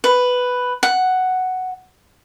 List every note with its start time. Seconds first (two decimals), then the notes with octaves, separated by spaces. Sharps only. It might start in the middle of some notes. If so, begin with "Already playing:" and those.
0.04 B4
0.83 F#5